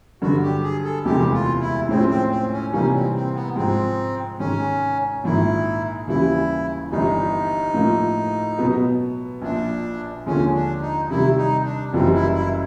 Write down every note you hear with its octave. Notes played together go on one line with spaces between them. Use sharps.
G2 D3 F#3 F#4
G4
G#4
A4
E1 D2 C3 E3 G#3 G4
F4
E4
A2 F3 G#3 C4 C#4
C4
C4
C#4
C3 E3 G3 A#3 C#4 D#4
C4
C4
B3
G#2 F3 G#3 C4
G#2 D#3 G#3 C#4
A#1 G#2 D#3 E4
D#2 C#3 E3 G3 E4
G1 G2 E3 G3 D#4
A2 F3 A#3
B2 F#3 B3
A#1 A#2 F3 D4
D#2 D3 F3 G#3 C#4
D4
D#4
C3 D#3 G3 E4
D#4
D4
F#1 F#2 C#3 E3 G3 C4
E4
E4